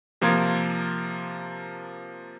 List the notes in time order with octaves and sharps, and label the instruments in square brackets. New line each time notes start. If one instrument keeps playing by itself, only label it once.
[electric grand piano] C3 F3 A#3 F4 A#4 G#6